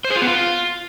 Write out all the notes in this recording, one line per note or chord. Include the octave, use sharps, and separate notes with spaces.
C5
G#4
F4
B3
F4